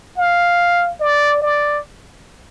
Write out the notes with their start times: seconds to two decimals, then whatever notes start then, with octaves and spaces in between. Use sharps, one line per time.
0.18 F5
1.01 D5
1.42 D5